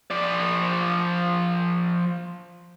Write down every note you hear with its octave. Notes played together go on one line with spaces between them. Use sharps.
F3 D5